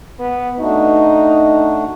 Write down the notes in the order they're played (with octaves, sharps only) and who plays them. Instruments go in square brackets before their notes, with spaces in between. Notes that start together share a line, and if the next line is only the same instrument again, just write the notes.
[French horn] B3
[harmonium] A3 D4 F#4 [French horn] D#4